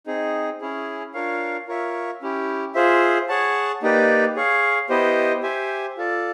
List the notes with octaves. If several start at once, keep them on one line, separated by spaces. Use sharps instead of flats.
C4 D#4 G#4
C#4 E4 G#4
D4 F4 A#4 C#5 F5
F4 A#4 C#5 E5
C#4 E4 G4
F4 G#4 C5 E5
G#4 C#5 F#5 A5
A#3 D#4 G4 B4 D5
G#4 C#5 F5
B3 E4 G4 C5 D#5
G4 C5 E5 G#5
F4 A4 D5